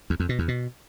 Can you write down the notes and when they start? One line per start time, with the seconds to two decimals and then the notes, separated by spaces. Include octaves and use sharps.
0.10 E2
0.20 F2
0.29 B2
0.39 E2
0.48 B2